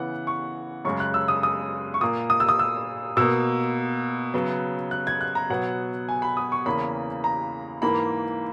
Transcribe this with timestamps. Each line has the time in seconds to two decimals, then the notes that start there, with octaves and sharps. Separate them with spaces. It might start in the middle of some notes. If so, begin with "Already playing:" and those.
Already playing: C#3 E3 B3 F#5
0.27 C#6
0.85 F#2 C#3 G#3 C#6
1.00 F#6
1.14 E6
1.28 D#6
1.43 D#6
1.94 C#6
2.01 A#2 A#3 D#6
2.30 D#6
2.40 E6
2.49 D#6
2.59 E6
3.17 B2 A#3 E6
4.34 C#3 F#3 B3
4.91 F#6
5.07 G#6
5.21 F#6
5.35 A#5
5.50 B2 F#3 B3 F#5
6.09 G#5
6.22 B5
6.37 D#6
6.52 C#6
6.66 E2 C#3 E3 A#3 B5
7.24 A#5
7.82 G#2 E3 A#3 B5